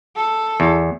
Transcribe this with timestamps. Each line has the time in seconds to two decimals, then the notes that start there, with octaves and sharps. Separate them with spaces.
0.16 A4
0.60 E2